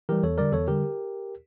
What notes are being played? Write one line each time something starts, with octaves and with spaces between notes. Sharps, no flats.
E3 G3 G4 A#4
E2 A4 C#5
D3 G3 A#4 D5
E2 A4 C#5
D3 G3 G4 A#4